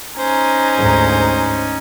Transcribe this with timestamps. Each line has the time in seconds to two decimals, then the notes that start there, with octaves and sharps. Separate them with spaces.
0.18 C#4 D#4 C5 G#5 A#5
0.77 D2 G#2